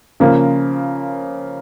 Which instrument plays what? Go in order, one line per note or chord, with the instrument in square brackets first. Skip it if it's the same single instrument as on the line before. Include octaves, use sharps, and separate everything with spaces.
[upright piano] C#3 F3 A#3